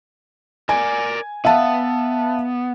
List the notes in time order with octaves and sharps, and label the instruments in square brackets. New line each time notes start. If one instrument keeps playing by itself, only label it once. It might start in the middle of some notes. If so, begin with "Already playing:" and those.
[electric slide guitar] A#4 D5 [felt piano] G#5
[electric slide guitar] B3 [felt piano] E5 F5 A5